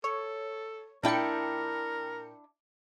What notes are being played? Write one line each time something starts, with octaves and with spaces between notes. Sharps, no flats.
A4 C#5
A#2 D4 E4 A#4 D5 G5 C#7